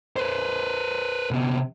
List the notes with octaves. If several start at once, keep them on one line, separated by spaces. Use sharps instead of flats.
B4 C5
C3 B3